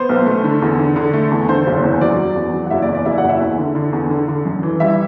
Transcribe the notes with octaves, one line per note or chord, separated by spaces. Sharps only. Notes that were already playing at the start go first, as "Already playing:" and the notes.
Already playing: B3 C5
B1
A3
D3
E2
D3
D3
A3
E2
D3 C5
F#1
E2 C5
F#3 D5
F#3
E2
F#3
F#5
F#1 E4 E5
D5
E2
D5
F#1 E4 E5
F#4 F#5
F#1
E4 E5
E2
D3
D3
E2
D3
D3
F#2
E3
G3 E4 E5